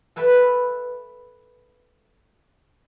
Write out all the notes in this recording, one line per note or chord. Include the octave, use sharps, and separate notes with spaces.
A4 B4 E5 G5 A5 B5